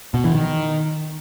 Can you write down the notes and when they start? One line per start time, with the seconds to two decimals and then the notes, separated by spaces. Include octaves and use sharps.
0.14 B2
0.24 E3
0.35 D#3